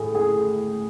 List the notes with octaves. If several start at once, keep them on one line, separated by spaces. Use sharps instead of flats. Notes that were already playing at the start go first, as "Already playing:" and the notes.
Already playing: A2 G#4
G#4